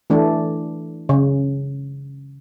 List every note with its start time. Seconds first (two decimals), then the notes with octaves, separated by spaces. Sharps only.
0.10 E3 A3 D4
1.09 C#3